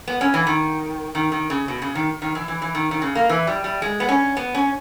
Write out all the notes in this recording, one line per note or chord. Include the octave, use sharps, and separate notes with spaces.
B3
C#4
E3
D#3
D#3
D#3
C#3
B2
C#3
D#3
D#3
E3
E3
E3
D#3
D#3
C#3
A#3
E3
G3
G3
G#3
B3
C#4
B3
C#4